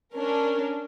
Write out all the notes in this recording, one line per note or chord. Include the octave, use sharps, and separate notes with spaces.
C#4 D4 A#4